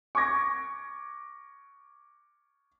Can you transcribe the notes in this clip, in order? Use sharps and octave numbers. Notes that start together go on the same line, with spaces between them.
C#6 D6 G#6 A#6